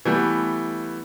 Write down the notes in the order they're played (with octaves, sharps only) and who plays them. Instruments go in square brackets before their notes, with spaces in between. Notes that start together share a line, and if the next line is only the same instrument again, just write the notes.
[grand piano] E3 G3 A3 B3